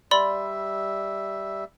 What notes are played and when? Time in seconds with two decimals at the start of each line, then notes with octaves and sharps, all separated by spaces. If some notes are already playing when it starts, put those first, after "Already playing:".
0.11 G3 D5 E5 B5 C6